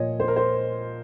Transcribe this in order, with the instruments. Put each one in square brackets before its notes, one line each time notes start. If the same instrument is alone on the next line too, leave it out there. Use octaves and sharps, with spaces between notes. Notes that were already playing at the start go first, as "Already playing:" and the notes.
Already playing: [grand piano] A#2 F3 C#5 D#5
C5
A#4
C5